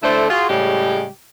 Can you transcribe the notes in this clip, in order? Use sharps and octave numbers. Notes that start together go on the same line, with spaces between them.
D3 A3 D4 E4 A4 C5
F4 F#4 G#4
A2 C#3 G3 G#3 G4